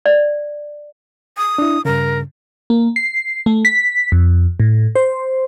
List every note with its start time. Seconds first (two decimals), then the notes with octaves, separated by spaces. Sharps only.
0.06 D5
1.37 D#6
1.58 D4 E4
1.85 G2 C#3 A#4
2.70 A#3
2.96 C7
3.46 A3
3.65 B6
4.12 F2
4.60 A2
4.96 C5